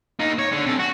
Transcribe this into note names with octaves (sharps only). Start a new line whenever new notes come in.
A#3 D#4
C#5
D3
C3 A4
F#4